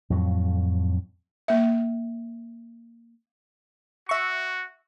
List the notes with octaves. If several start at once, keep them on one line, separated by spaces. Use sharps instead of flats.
F2 A2 F#3
A#3 E5
F#4 E5 C#6